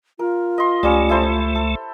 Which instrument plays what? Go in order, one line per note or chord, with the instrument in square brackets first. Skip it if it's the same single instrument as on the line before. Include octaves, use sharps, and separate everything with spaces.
[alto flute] F4 [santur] A#4
[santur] D#5 C6
[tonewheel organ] C#2 A3 [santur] G3 C#4
[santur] E4 A4 C5
A4